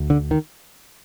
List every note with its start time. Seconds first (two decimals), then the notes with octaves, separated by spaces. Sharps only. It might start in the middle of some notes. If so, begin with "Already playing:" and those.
Already playing: D2
0.10 D3
0.31 D#3